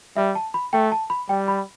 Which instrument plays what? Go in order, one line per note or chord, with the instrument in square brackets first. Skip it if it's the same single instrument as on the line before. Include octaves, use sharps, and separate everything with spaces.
[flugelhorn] G3 [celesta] E5
[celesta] A5
B5
[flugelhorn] A3 [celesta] G5
[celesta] A5
B5
[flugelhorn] G3 [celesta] G5
[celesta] B5